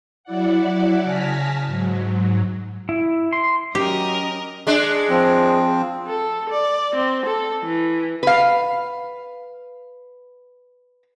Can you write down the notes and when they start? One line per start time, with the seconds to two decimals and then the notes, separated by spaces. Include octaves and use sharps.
0.24 F#3 E4 D5 F#5
1.02 C#3 G#5 A5 F6 A#6 B6
1.66 G#2 F#3
2.89 E4
3.33 C6
3.75 F#3 C#4 G4 A#4 D#5
4.67 G#3 D4
5.09 F3 C4
6.07 A4
6.50 D5
6.95 C4
7.26 A4
7.63 E3
8.23 B4 F5